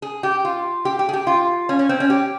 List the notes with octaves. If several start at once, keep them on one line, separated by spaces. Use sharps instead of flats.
G#4
G4
F4
G4
G4
G#4
G4
F4
C#4
C#4
C4
C#4
G4